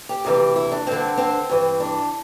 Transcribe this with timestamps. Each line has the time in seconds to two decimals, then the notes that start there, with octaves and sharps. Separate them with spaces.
0.09 G4
0.25 D2 C3 E3
0.56 E4
0.71 D4
0.87 G2 D3 C4
1.17 C4
1.50 G2 E3
1.80 D4